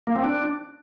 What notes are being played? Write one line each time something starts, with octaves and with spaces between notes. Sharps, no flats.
A#3
C4
D4